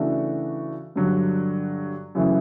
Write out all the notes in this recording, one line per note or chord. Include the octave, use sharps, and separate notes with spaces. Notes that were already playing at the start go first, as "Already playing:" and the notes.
Already playing: C#3 E3 A3 D4 F#4
G2 D3 F#3
F#2 C#3 E3 A3